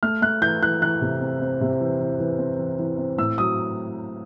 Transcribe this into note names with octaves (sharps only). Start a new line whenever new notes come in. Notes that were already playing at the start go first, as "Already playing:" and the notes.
A3 F6
A3 F#6
E3 G6
E3 F#6
E3 F#6
C3
C4
C4
C3
E3
E3
E3
C4
E3
E3
C4
A2 E6
F#3 D#6